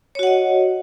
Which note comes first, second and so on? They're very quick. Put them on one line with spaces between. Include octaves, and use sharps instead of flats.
C#5 F#4 F#5 D#5